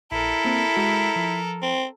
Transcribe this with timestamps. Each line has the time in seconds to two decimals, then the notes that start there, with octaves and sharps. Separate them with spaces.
0.12 A#1 E4 A4 A#4
0.45 A#3 C4
0.76 G#3 F#4
1.16 F3
1.62 C4